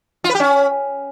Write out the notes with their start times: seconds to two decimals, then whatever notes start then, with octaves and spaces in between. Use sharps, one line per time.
0.24 F4
0.29 B4
0.35 G4
0.40 C#4